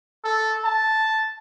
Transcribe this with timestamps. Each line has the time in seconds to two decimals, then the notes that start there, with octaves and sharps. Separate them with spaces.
0.24 A4
0.64 A5